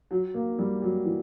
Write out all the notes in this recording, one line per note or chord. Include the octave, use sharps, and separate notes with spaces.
F#3
A#3
G3
F#3
E3